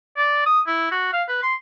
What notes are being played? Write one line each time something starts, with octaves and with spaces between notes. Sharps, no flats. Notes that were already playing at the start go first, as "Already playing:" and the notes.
D5
D#6
E4
F#4
F5
B4
C6